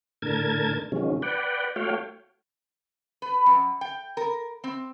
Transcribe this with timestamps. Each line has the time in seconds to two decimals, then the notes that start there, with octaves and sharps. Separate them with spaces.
0.22 A2 D3 A#4 A5 G#6
0.92 C3 D#3 F3 F#3 G#3 C#4
1.22 B4 D5 F#5 G5
1.76 A3 F#4 C#5 F5 G5
3.22 B4
3.46 F#2
3.81 G5
4.17 A#4
4.64 C4